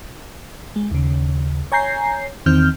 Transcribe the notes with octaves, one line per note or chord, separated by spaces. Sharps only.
G#3
D#2 C#3
C#5 G#5 A#5 G6 C7
E2 D#3 C4 F6 G6